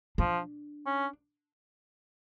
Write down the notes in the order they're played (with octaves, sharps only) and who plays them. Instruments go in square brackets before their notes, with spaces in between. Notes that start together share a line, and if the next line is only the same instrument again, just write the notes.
[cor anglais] F3 [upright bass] D4
[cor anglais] C#4